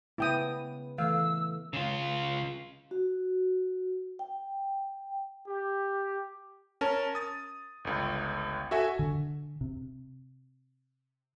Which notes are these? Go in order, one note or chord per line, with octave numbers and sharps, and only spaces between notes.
C#3 B3 E4 G5 A5 D#6
E3 A3 F5 E6
C#3 F4
F#4
G5
G4
C#4 A#4 A5
D#6 A6
G1 C#2
F#4 A4 E5 G#5
D3
C3